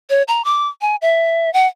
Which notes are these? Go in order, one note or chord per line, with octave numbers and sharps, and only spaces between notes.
C#5
A#5
D6
G#5
E5
F#5